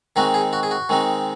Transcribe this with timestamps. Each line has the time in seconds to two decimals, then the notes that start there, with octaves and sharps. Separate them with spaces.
0.16 D#3 G#3 C4 D#4 F#4
0.34 G#4
0.53 F#4
0.63 G#4
0.71 F#4
0.89 D#3 G#3 C4 D#4